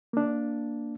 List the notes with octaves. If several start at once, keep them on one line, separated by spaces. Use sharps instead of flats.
A#3 D4